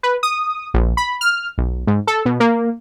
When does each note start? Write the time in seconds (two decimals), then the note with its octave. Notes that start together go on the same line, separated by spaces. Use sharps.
0.03 B4
0.23 D#6
0.74 A#1
0.97 B5
1.21 F6
1.58 B1
1.87 G#2
2.07 A4
2.25 B2
2.40 A#3